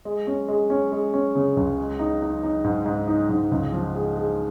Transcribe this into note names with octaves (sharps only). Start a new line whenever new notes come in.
G#3
C#4
G#3
C#4
G#3
C#4
C#3
C#2
G#3
D#4
D#4
D#4
G#2
G#2
D#4
G#2
C#2
F3
G#3
G#3